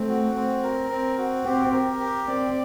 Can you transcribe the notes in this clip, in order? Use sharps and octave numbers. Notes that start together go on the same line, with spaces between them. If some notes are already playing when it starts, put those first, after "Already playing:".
Already playing: A3 C4
F#4
C4
A#4
C4
F#4
C4 G4
A#4
G4
C4 D5